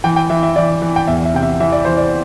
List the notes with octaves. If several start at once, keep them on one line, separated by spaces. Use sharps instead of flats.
E3 G5
G5
E3 E5
E5
E3 D5
E3
G5
E2 E5
E5
C3 G5
E5
E3 E5
D5
E3 C5
D5